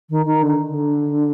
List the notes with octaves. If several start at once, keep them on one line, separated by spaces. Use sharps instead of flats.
D#3
D#3
D3
D3